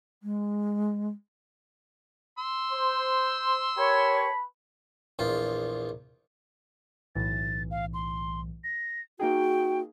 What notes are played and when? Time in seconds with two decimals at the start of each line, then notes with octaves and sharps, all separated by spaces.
0.23 G#3
2.38 C6 E6
2.72 C5
3.77 G4 A#4 B4 C#5 A5 B5
5.19 A#1 E2 F4
7.15 B1 A2 E3 A6
7.71 F5
7.94 C6
8.64 A#6
9.20 A#3 D#4 F#4 G#4 G5